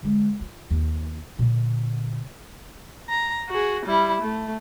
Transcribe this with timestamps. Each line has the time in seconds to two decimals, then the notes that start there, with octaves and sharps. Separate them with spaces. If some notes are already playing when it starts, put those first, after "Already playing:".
0.03 D3 G#3
0.41 F4
0.71 D#2
1.39 A#2 D3
3.09 A#5
3.50 F#4 G#4
3.86 G3 E4
4.22 A3